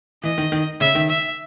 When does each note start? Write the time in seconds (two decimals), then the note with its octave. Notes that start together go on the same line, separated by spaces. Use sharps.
0.23 E3 D#5
0.38 D#3
0.52 D#3
0.80 C#3 E5
0.95 D#3
1.10 E5